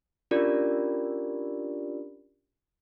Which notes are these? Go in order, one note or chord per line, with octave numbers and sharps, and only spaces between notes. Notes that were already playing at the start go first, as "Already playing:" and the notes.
C#4 D4 F4 G4 A#4 D5